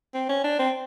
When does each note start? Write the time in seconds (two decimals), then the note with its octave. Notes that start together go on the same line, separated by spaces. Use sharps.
0.14 C4
0.29 C#4
0.44 D4
0.59 C4